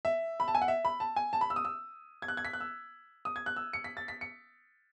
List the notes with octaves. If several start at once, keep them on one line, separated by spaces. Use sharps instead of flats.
E5
B5
A5
G#5
F#5
E5
B5
A5
G#5
A5
B5
E6
D#6
E6
G#6
F#6
G#6
B6
F#6
E6
D#6
G#6
F#6
E6
C#7
B6
A6
B6
C#7